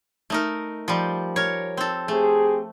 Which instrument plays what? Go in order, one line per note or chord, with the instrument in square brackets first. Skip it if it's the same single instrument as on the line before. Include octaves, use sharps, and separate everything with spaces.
[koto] A3 D#4 A#4
F3 G3
A#4 C#5
C4 A4
[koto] A3 [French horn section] C4 G4 G#4